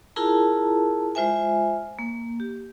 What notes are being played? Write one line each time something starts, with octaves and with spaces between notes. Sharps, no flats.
E4 F4 G#4 A#4 A5 A#5
G#3 F4 C5 E5 G#5
A#3
G4